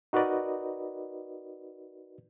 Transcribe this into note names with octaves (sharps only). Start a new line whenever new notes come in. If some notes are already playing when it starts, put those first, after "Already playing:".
D#4 F#4 A#4 B4 D5 D#5